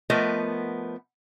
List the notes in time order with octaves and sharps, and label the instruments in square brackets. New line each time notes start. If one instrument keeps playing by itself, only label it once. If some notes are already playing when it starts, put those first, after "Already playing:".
[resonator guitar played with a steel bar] F3 A3 B3 A#4 D#5